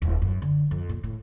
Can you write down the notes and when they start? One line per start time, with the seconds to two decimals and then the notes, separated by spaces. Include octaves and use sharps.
0.02 D#1
0.22 F#2
0.42 D3
0.71 F2
0.89 A#2
1.03 A2